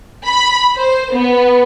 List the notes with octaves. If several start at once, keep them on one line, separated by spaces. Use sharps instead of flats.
B5
C5
B3